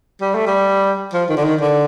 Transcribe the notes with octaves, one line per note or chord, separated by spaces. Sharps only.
G3
A3
G3
F3
D#3
D3
D#3
D3